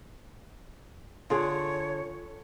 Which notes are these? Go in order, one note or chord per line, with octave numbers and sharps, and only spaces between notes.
D3 F4 G#4 C#5